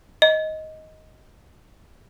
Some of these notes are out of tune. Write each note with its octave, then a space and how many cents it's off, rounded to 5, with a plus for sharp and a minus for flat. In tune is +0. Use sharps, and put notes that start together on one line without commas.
D#5 +10